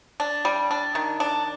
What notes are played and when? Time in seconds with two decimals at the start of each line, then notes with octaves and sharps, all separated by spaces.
0.20 D4
0.45 G3
0.71 D4
0.95 D#3
1.20 D4